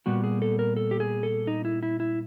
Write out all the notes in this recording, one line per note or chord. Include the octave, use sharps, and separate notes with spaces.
A#2 G3 B3 F#4
G#4
A4
A#4
A4
G4
G#4
A4
D#4
E4
E4
E4